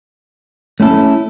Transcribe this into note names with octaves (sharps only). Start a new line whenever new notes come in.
A3 C#4 E4 A4